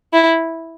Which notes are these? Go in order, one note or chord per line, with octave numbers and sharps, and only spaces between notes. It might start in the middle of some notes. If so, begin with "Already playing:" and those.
E4